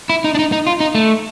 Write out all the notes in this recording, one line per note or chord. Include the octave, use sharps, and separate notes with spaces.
E4
D#4
D4
D#4
D#4
F4
D#4
A3